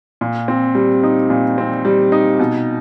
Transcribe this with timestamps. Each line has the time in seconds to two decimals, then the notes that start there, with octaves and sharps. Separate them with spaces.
0.21 A#2
0.48 C4
0.75 G3
1.03 D#4
1.30 A#2
1.58 C4
1.85 G3
2.12 D#4
2.39 B2